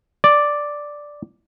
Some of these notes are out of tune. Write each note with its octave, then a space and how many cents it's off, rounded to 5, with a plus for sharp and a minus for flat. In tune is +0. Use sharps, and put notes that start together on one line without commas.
D5 +0